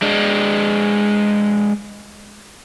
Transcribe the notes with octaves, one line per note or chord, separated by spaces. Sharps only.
G#3 D4